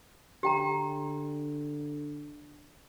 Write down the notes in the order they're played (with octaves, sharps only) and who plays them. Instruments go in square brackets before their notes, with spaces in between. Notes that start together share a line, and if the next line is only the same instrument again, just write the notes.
[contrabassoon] D3 [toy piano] G4 G5 A#5